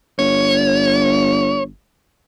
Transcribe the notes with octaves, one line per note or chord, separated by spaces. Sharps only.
G1 C#5